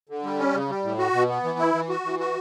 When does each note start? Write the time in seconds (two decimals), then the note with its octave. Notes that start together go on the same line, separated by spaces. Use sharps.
0.09 D3
0.24 G3
0.39 C#4
0.54 C#3
0.69 G3
0.84 A2
0.99 F#4
1.14 B2
1.29 B3
1.44 E3
1.59 E4
1.74 E3
1.89 F#4
2.05 E3
2.20 F#4